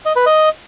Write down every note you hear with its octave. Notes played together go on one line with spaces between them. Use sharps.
D#5
B4
D#5